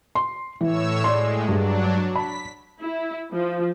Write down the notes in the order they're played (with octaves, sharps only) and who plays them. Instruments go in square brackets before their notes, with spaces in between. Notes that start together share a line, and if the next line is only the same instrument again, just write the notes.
[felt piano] C6
[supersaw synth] A2 C#5 E6 [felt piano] E3
[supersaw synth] A2 G#3 [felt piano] D5 C6
[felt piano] G2 G#3 [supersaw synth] F#3 D4
[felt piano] A5 B5 [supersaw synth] B6
[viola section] E4
F3